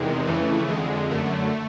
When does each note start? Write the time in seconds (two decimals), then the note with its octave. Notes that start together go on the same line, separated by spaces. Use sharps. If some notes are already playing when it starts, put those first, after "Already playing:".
Already playing: E2 C3 D#3 G#3
0.27 F2 C#3 E3 A3
0.69 F2 D3 G#3
1.10 F#2 D3 A3